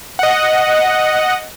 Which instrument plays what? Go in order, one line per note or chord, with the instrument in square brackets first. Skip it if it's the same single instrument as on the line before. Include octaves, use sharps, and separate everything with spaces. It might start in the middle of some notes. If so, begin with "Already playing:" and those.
[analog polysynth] D#5 F#5